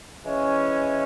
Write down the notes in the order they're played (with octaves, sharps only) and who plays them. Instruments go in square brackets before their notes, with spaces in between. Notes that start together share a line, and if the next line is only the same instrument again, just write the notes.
[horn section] E3 G#3 C#4 E4